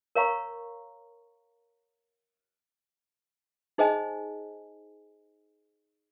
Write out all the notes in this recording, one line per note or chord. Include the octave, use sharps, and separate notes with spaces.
A#4 C#5 F5 A#5 C#6
D#4 G#4 C5 D#5 G#5